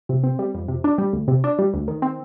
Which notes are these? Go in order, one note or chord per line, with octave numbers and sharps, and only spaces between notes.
C3
C4
G3
F2
C3
D4
G3
D2
C3
D4
G3
D2
D#3
C4